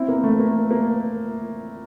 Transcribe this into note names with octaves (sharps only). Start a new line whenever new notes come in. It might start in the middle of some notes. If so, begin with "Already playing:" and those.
Already playing: C4 E4
A#3
A3
A#3
A#3